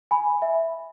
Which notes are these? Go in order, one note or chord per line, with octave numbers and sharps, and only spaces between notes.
G#5 B5
E5